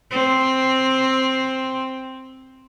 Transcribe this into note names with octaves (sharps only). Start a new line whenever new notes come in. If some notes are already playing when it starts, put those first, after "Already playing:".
C4